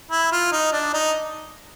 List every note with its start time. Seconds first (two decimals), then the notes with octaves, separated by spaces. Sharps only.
0.11 E4
0.32 F4
0.52 D#4
0.73 D4
0.93 D#4